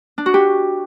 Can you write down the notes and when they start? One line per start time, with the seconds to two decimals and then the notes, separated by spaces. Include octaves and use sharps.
0.18 D4
0.26 F#4
0.34 G4